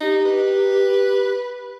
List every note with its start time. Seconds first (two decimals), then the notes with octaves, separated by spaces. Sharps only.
0.01 D#4 G4
0.25 B4